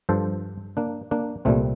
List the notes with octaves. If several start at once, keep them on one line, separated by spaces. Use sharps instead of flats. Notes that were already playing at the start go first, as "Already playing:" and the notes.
G2 F3 A4 C5
A#3 D4
A#3 D4
C2 A#2 G3 A3 C4